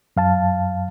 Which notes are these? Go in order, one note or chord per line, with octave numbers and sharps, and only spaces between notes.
F#2 F5 A5